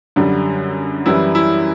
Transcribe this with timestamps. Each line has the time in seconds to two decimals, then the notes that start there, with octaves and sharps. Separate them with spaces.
0.16 F#2 D3 G3
1.06 F#2 E3 G3 E4
1.35 E4